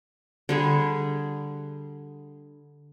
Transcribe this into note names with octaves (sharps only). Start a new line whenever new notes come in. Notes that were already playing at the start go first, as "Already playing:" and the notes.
D3 G3 G#4